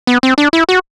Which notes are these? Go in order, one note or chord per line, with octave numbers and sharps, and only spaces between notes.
B3
C4
D4
E4
F#4